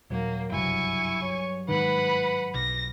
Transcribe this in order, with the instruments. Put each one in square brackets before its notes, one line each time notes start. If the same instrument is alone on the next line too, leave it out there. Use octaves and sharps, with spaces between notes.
[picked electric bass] D#1 [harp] F#3 C#5 [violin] A#3
[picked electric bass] F#1 C2 [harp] G2 F#3 [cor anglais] E4 [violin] G#5 C#6
[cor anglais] C#5
[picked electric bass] G#2 D#3 [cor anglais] B4 [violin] F#5 B5
[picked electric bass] B1 [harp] B4 D6 F6 [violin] A#6